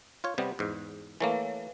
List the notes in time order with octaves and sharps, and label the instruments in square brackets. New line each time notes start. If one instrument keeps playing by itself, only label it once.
[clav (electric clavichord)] F4 C#5
C3 G3 B3
E2 G#2
[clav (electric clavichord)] E3 A3 A#3 [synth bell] B4 C#5 F5